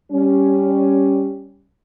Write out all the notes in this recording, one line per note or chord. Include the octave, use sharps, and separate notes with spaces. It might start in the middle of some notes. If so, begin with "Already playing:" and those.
G3 C#4